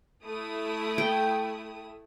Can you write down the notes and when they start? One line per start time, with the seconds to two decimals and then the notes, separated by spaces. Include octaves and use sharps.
0.24 A3 E4 D#6
0.98 G5